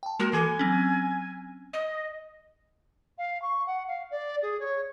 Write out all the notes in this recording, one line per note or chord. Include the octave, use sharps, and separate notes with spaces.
G5 A5
G#3 A#3 F#4 A#4
E3 A4 G#5 D6
F#3 C4 C#4
D#5
F5
C#6
F#5
F5
D5
G#4
C#5